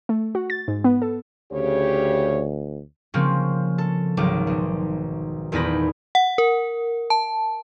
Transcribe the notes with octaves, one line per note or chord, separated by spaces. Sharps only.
A3
F#4
A6
G#2
B3
A4
D2 C#3 G4 C#5
C#3 F3 A#3 C4 C#4
A4
G#1 C#2 F#3 D6
B1
D#1 E2 D#4 D5 B5 A#6
F#5
A#4
A5